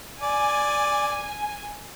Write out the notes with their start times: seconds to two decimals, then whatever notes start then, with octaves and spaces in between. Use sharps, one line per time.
0.23 D5 G#5